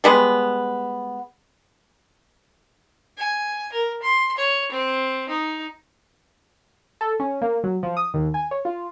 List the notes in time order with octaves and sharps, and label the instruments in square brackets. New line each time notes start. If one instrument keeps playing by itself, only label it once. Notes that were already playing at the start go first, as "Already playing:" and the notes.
[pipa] G3 G#3 B3
[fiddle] G#5
A#4
C6
C#5
C4
D#4
[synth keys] A4
C#4
A#3
F#3
F3
D#6
D#2
G#5
C#5
F4